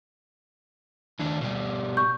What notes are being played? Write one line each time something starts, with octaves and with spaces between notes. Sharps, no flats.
D#2 D4
B2 G3
C#6 G6